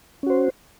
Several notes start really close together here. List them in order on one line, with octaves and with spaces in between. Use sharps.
C#4 F#4 C5